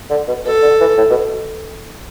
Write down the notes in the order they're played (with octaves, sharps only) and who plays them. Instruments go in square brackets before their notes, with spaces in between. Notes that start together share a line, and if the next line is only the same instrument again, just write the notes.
[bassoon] D3
B2
[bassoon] B2 [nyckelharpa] A4
[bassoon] D3
E3
A2
B2